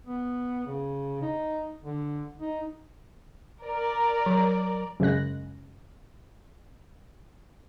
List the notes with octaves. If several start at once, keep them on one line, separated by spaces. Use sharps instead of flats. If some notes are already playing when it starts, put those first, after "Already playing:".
B3
C#3
D#4
D3
D#4
A#4 D5
F#3
F#2 C#3 G#3 F#6 A#6